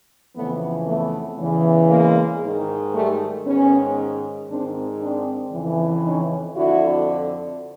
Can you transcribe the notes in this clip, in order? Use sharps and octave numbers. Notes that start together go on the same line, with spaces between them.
F2 C#3 E3 A3 B3
A3 B3
E2 C#3 E3
G#3 A#3
G#2 D#3
G3 A3
G#2 D#3 B3 C#4
G#2 D#3 C4 D4
C4 D4
F2 C#3 E3
C#4 D#4
F2 D3 E4 F#4